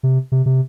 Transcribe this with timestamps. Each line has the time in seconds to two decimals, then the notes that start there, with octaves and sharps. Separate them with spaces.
0.03 C3
0.32 C3
0.46 C3